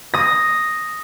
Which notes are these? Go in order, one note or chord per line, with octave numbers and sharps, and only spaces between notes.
D#6 A#6